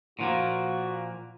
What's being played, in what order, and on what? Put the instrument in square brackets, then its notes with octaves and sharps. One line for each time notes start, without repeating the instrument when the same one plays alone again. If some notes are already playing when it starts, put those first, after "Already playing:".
[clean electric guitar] A#2 F3 A#3 [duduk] F#4